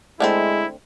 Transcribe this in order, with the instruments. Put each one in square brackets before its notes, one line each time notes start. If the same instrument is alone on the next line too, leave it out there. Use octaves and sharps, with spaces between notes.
[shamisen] D3 A3 C4 [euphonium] G#3 [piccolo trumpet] E4